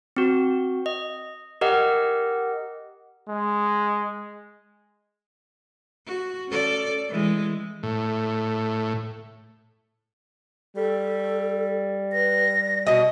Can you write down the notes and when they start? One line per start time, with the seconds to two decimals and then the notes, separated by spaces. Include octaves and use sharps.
0.16 C4 F#4
0.86 D#5
1.61 G4 A#4 D#5 F#5
3.29 G#3
6.06 F#4
6.48 C#4 A4 D5
7.09 E3 G#3
7.83 A2
10.76 G3 A4
12.13 B4 A#6
12.54 D5
12.87 B2 F#4 D#5